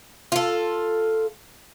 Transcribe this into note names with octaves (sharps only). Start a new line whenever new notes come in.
F4 A4